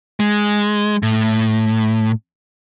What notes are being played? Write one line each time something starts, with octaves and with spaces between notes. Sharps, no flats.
G#3
A2